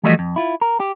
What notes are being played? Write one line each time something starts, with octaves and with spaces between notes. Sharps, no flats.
E3 F3 G3 A3 F#4 D#5
F2
E4 F4
A#4
G4